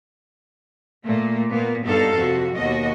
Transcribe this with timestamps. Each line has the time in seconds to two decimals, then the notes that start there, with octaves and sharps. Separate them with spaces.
1.04 A#2 A3 A#3
1.51 A#2 A#3 B3
1.85 G2 B3 D#4 A4 F5
2.17 F2 C3 F#4
2.55 D#2 B2 F#4 D#5